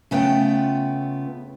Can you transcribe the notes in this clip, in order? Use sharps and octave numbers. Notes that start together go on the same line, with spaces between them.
C#3 A3 B3 F4 G5